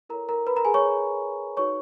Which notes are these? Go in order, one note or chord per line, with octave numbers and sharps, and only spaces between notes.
E4 A4 A#4 C#5 A#5
A#4 A#5
B4 B5
A#4 A#5
G#4 G#5
C#5 C#6
D#4 F#4 B4 C#5 C#6